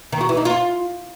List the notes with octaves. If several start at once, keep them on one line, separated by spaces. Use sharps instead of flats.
D#3
F#4
E3
D#4
F4